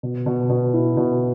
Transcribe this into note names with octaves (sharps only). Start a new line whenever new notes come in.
B2
B2
B2
E4
B2